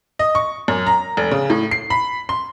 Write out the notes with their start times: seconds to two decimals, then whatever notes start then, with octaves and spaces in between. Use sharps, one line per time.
0.19 D#5
0.35 C#6
0.68 F#2
0.87 A#5
1.17 F1
1.31 C#3
1.50 A2
1.71 C7
1.90 B5
2.29 C6